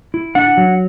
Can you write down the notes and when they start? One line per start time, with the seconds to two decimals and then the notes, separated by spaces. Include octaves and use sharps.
0.14 E4
0.35 D4 F#5
0.57 F#3